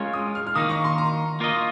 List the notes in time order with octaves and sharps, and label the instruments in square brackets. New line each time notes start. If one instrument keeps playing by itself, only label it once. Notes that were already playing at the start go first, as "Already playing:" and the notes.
Already playing: [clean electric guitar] G#3 C#4 F4 A#4 C#5 [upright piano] F5
[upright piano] D#6
F6
F6
[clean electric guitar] D#3 A#3 D#4 [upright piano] D#6
[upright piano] C#6
C6
A#5
[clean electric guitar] A#3 F4 A#4 D#5